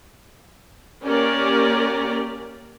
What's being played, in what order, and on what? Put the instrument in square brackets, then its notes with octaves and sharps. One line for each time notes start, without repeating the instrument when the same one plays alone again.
[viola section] A#3 C#4 G4 A#4 D5